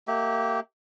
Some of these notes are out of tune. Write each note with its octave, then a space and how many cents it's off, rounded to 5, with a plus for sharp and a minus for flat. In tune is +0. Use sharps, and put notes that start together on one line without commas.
A#3 -35 G4 -20 E5 -35